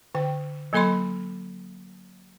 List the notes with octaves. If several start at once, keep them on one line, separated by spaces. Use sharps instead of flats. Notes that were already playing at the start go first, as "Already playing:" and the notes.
D3 G5
F#3 A#3 A4 D#5 B5 C6